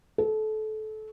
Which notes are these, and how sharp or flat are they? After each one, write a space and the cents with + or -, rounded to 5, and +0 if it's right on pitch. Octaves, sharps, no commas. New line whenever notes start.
A4 -25